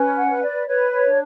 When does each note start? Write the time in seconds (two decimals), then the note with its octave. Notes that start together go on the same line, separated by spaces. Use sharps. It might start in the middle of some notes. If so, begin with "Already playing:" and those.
Already playing: C#4 B4
0.17 F#5
0.29 B4
0.42 D5
0.67 B4 C#5
0.91 C#5
1.04 D4